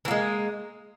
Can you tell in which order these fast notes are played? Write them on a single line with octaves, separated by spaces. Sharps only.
E3 A#3 G#3